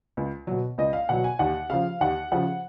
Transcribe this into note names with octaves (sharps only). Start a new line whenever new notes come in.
C#2
B2 F#3
C#2 D#5
F5
B2 F#3 F#5
G#5
D#2 F#5
C#3 F3 F5
D#2 F#5
C#3 F3 F#5